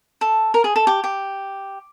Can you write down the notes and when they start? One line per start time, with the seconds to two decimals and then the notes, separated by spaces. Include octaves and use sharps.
0.21 A4
0.54 A#4
0.64 G#4
0.76 A4
0.87 G4
1.04 G4